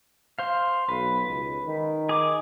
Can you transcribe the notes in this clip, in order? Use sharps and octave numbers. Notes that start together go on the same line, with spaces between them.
C5 F5
B1 B4
C#2
D#3
G#4 D6